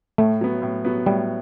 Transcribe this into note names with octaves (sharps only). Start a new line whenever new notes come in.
A2 A3
F#3 B3
A2
F#3 B3
A2 G3